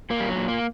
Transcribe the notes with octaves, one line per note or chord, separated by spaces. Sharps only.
A#2 A#3
G3
F#3
A#2
A#3